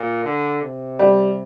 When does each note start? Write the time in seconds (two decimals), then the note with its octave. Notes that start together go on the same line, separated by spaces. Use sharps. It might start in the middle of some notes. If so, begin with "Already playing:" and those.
Already playing: A#2
0.24 D3
0.62 C3
0.99 G3